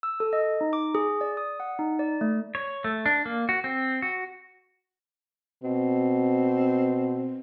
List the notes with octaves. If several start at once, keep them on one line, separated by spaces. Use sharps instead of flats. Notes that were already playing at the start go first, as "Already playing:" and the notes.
E6
A4
D#5
D#4
D6
G#4
D5
D#6
F#5
D#4
D5
A3
C#5
A3
D4
A#3
F#4
C4
F#4
B2 C4